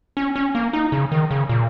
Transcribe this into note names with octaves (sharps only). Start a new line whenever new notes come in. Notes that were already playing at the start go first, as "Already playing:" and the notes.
C#4
C#4
A#3
D#4
C#3
D#3
C#3
A#2